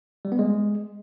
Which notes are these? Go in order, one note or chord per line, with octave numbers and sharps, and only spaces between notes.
G3
B3
G#3